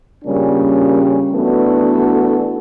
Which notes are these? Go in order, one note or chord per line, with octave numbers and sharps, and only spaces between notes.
A#2 C#3 G3 C#4 D4
E3 A3 B3 D4 F#4 A4